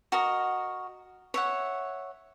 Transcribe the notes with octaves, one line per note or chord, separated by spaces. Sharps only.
F#4 A#4 D#5
C#5 E5 F#5